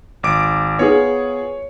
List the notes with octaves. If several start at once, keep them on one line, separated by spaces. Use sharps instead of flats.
G#1 D6 D7
B3 F4 G#4 C#5